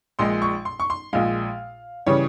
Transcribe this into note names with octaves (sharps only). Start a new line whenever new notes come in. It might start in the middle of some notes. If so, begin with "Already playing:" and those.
A#1 A#2 G#3 C6
C#6
C6
C#6
C6
A#1 A#2 G#3 F5
C#3 E3 G3 C#5